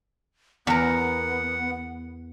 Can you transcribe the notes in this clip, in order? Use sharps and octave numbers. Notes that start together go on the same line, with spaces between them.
E2 B3 A#4 F#5